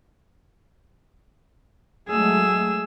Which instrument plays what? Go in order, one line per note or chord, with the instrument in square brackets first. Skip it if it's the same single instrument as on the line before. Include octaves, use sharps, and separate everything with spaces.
[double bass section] F#3 G#3 A3 [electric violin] G#4 E6